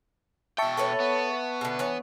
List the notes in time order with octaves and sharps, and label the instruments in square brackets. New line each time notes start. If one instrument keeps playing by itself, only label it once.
[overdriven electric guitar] B2 G5 [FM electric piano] E5 A5 C#6
[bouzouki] A4 B4 C#5
[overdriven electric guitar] B3
[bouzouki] B2 D3
E3 C#5